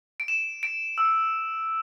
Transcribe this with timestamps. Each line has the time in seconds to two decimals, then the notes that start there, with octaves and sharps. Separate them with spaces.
0.20 D7
0.28 E7
0.63 D7
0.98 E6